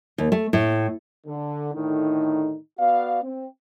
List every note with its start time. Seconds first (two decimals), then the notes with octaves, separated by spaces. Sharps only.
0.18 D#2
0.32 A3
0.53 A2
1.27 D3
1.74 A2 D3 D#3 D#4
2.79 B3 F#4 D5 F5
3.23 C4